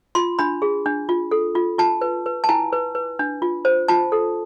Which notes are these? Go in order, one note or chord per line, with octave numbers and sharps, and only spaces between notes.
F4 C6
D4 B5
G#4
D4
F4
A4
F4
F4 A5
B4
B4
A5
E4 G#5
B4
B4
D4
F4
C5
F4 A5
A4